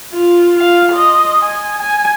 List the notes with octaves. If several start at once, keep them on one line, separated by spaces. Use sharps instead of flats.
F4
F4 F5
D#5 C6
G#5
G#5